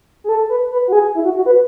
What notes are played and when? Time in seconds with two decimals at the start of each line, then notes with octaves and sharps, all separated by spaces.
0.24 G#4
0.29 A4
0.49 B4
0.71 B4
0.88 F#4
0.93 G#4
1.15 E4
1.24 F#4
1.36 F#4
1.46 B4